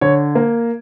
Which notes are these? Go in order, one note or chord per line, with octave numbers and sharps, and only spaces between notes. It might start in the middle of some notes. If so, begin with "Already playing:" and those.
D3 C#5
A#3